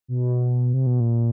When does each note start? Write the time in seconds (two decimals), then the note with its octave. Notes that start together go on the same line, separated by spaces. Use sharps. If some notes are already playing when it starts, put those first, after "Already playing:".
0.08 B2
0.74 C3
0.86 B2
1.00 A#2